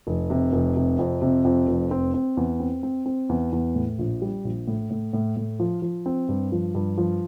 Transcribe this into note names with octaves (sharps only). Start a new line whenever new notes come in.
F1
C3
F1
C3
F2
C3
F2
F1
C4
C4
E2
C4
C4
C4
E2
E2
A2
A#1
G3
A#1
A2
A2
A2
A2
F3
F3
C4
G2
F3
G2
F3